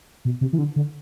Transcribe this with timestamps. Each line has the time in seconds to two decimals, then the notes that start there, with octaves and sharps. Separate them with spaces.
0.25 B2
0.41 C3
0.53 E3
0.58 D3
0.76 D3